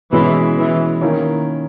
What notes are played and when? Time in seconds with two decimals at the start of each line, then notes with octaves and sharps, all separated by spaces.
0.12 B2 E3 G#3 C#4 E4
0.58 E3
1.01 D#3 A#3 C#4 E4